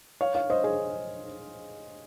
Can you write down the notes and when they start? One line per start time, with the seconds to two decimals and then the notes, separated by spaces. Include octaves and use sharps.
0.21 C#5 F5
0.35 C#5 F5
0.50 C5 D#5
0.64 G#4 C5